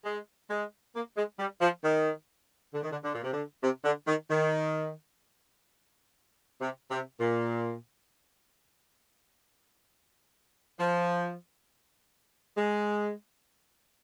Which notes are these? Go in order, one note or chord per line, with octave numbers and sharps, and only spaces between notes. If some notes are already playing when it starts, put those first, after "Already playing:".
G#3
G#3
A#3
G#3
G3
F3
D#3
D3
D#3
D3
D3
A#2
C3
D3
C3
D3
D#3
D#3
C3
C3
A#2
F3
G#3